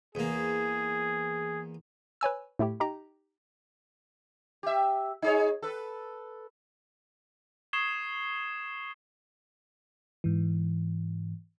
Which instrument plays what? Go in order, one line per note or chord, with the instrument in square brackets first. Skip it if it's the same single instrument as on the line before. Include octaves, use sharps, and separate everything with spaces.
[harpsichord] E2 A#3 [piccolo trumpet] G#4
[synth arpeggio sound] B4 C#5 G#5 E6
A2 A3 E4 G4
D#4 G4 A#5
[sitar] G4 E5
D#4 G#4 C#5
A4 B4
[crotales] C#6 D#6 G#6 C7 E7 G7
[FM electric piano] G#2 E3